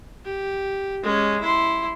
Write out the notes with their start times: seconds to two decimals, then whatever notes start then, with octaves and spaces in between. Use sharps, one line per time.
0.25 G4
1.03 G#3 C#4
1.41 E4 C6